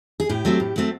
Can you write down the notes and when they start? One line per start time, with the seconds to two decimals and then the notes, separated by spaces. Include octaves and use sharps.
0.20 G#4
0.29 A2 G4
0.45 F#3 A3 C4
0.60 A2
0.76 F#3 A3 C4